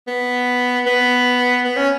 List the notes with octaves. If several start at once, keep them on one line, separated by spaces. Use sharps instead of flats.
B3
B3
B3
C#4